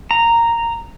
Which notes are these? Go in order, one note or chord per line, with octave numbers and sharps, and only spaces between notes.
A#5